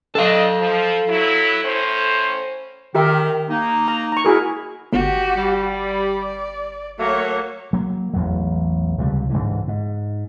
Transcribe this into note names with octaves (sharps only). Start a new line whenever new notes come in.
C4 D4 A4 D#5 F5
F3
F#3 E4
A2 C#4 C5
D#3 G4 A#4 E5
A#3 D#4
A#5
A#5 C#6
E4 F#4 G#4 A#4
G1 F#4 G4
G3
D5
F#3 A3 A#3 C#5
F#3 A#3
A1 E2 F#3
C#2 C3 G3
A1 G#2 D3 E3
G#2